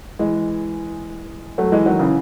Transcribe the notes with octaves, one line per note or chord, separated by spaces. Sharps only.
E3 G#3
F#3 A3
E3 G#3
D#3 F#3
C#3 E3